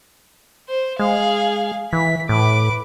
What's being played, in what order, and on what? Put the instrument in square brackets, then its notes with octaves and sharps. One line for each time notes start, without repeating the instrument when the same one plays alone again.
[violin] C5
[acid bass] G#3 [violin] G#4 F5
[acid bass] E3 [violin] B6
[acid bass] A2 [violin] B4 D6